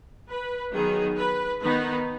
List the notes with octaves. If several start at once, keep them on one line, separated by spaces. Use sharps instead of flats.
B4
D#3 F#3 B3 D#4 G#4
B4
D#3 B3 D#4 B4